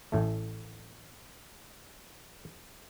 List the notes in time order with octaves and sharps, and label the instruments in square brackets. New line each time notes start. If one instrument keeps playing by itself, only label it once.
[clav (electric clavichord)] A1 A2 A3